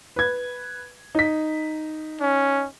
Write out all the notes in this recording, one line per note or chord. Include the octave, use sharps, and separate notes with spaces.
B4 G#6
D#4 B6
C#4